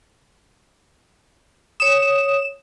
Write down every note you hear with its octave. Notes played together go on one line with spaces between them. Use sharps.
C#5 D#6 E7